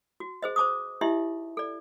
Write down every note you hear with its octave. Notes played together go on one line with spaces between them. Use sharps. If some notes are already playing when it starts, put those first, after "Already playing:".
F#4
G#4 C5 D#5
C5 A5 D6 D#6
D#4 E4 G4 D#5 E5 C6
A4 D5